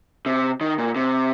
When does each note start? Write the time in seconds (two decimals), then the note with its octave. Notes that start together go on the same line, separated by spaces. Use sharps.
0.26 C3
0.61 D#3
0.78 A#2
0.96 C3